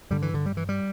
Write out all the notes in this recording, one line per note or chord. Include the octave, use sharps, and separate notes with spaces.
G2 D3 G3
E3
D3
G3
E3
G3